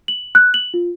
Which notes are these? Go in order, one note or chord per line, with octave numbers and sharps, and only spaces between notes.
F#7
F#6
F#7
F4